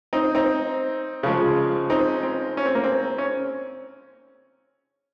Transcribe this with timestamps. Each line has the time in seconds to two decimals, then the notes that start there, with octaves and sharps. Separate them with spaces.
0.13 C4 D#4
0.35 C4 D#4
1.23 C#3 F3 G#3
1.90 C4 D#4
2.23 C4
2.57 C#4
2.66 C4
2.75 A#3
2.84 C4
3.18 C#4